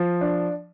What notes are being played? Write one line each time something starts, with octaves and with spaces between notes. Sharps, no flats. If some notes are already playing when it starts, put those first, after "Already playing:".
Already playing: F3
D4